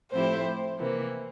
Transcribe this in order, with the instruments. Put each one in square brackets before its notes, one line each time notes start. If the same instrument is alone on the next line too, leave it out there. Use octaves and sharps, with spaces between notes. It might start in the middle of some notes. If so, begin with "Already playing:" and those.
[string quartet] A2 F3 C4 E4 G4 [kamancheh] C5
[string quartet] C3 E3 A#3